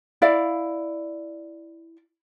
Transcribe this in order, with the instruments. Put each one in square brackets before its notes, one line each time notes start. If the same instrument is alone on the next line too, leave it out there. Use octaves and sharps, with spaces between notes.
[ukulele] E4 D5 F5